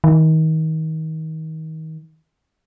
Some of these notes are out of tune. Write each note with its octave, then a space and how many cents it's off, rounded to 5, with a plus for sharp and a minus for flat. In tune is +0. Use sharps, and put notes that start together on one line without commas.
D#3 +30